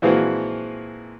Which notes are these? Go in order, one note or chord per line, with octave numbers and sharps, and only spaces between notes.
A#2 E3 F3 G#3 C4 F#4